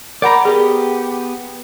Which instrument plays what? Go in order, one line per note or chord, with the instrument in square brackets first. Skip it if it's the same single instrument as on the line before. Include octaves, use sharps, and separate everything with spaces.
[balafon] A#4 F#5 B5 [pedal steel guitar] D5 A#5
[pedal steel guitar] B3 G4 [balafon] G#4